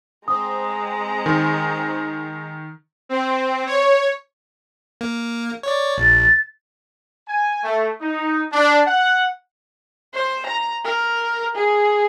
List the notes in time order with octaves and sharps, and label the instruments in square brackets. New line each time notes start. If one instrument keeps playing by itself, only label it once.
[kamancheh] G#3 A#5 [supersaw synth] C4 [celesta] D#6
[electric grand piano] D#3
[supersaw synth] C4
C#5
[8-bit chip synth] A#3
C#5 D5
[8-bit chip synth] A#1 [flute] A6
[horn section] G#5
A3
D#4
D4
F#5
[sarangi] C5
A#5
A#4
G#4